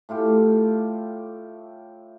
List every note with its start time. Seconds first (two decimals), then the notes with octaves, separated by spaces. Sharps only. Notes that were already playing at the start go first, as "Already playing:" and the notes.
0.09 A2 A3 F4 G4